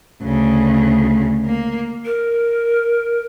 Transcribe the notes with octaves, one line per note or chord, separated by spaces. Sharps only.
D2 C#3
A#3
A#4